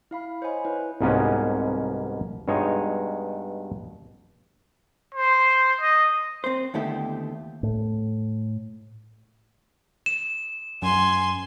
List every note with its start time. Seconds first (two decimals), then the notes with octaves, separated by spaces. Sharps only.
0.11 E4 F5 B5
0.42 C5 C#5 D#5 G#5 B5
0.65 E4 B4 C#5
1.01 C2 G#2 B2 A#3 B3 C#4
2.48 G2 B2 G#3 D#4 C#5 D#5
5.14 C5
5.81 D#5
6.44 C4 C5
6.74 D#2 D3 A3 B3 E4 G4
7.63 A2
10.06 E7
10.82 F#2 G#5 C6